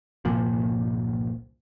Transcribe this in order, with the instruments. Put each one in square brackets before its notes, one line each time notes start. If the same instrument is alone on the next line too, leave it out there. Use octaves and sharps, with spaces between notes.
[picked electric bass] G1 C2 A#2 F3